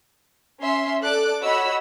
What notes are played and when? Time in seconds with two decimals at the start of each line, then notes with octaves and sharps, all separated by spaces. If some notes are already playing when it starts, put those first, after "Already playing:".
0.62 C#4 E5 C6
1.02 A4 D5 D6 F#6
1.43 F#4 C#5 D#5 B5 E6